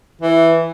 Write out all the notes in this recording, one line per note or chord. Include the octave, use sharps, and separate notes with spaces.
E3